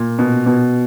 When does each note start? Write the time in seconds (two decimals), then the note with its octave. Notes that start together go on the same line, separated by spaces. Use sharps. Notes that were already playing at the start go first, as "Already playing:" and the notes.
Already playing: A#2
0.19 B2
0.46 B2